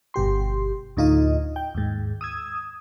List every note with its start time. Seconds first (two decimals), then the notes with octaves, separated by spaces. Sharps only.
0.14 G1 B2 G4 C6
0.97 D2 A2 D#4 F4 D#5
1.56 G5
1.75 D#2 G#2
2.21 D#6 E6 G#6